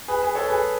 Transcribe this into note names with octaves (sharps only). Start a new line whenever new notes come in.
G#4 B4
G#4 B4
A4 C#5
G#4 B4